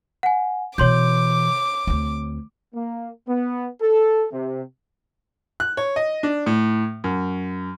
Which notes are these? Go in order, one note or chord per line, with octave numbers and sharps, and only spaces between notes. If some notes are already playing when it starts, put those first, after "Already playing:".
F#5 G#5
B2 E3 C#5 C6 D6 G6
D2 C4
A#3
B3
A4
C3
F#6
C#5
D#5
D4
A2
F#2